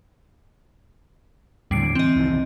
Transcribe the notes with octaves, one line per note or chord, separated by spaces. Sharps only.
D#2 A2 D3 G3 C7 D7
E3 C4 D#5
C2 D#3 E3